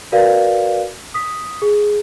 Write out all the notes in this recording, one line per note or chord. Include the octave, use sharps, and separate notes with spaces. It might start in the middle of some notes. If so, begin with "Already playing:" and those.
F#4 A#4 B4 D5 F5
D#6 B6
G#4